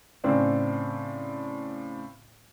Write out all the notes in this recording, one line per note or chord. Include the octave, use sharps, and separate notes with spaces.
A2 C#3 C4 D4